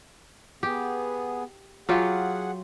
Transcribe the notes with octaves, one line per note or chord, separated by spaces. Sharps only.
B3 G4 G#4
F#3 F4 G4 G#4 F#5